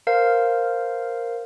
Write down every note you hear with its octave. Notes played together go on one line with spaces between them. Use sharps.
A#4 C5 F5